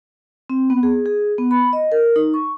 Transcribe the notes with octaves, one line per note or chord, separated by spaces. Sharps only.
C4
B3
G#4
G#4
B3
B5
D#5
A#4
D#4
C#6